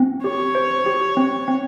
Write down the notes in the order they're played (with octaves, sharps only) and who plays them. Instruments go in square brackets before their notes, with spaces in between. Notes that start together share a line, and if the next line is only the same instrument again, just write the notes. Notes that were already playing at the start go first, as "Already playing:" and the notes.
Already playing: [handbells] C4
[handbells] G4 [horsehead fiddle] C#5
[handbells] C5
G4
C4
C4